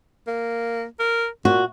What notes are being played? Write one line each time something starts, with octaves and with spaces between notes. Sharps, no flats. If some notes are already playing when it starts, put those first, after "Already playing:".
A#3
A#4
A#2 F#4